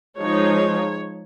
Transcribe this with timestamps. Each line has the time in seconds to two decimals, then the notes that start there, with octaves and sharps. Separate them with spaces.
0.19 F3 G#3 D#4 C#5